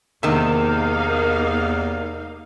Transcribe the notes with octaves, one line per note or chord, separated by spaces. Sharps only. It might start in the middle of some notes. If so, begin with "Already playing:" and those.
E2 C3 D#3 A#3 D#4 F5